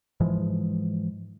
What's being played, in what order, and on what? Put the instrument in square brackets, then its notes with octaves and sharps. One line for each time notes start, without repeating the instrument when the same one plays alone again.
[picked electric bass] G#2 E3 F3 G#3